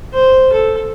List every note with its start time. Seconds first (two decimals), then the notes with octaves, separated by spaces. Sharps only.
0.13 C5
0.52 A4